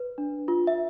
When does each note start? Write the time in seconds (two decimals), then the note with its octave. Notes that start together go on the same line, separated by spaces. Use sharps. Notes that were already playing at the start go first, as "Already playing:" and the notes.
Already playing: B4
0.18 D4
0.48 F4
0.67 E5